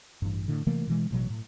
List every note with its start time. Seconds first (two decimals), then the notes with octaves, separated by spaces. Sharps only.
0.22 A1 G2
0.48 A2 D3
0.66 C3 E3 A3 A#3
0.87 B2 E3 G#3
1.11 A1 B2 F#3
1.30 A2